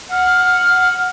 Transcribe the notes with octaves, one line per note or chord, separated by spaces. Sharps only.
F#5 F6